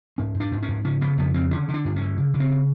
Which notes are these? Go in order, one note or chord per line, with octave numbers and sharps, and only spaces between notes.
G#2 C#4
G#2
D4
G#2
C#4
G#2
C#3 C#4
C#3 B3
F2 B3
C#3 C4
D3 C#4
D3
D4
G2
C#4
D3
C#3
C#3
C4
C#3